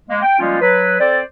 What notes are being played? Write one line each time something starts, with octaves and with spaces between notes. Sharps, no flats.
G#3 A#3
G5
F3 G3 G#3 A#3 C#4 F4
F#3 B4
C4 A4 C5 D5